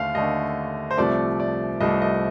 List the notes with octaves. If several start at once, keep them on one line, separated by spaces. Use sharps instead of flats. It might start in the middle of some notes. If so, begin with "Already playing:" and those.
Already playing: D#2 D3 A3 F5
D#2 D3 A3 D#5
C5
C2 C3 F3 A3 D5
D5
C2 C3 F3 A3 D#5
D#5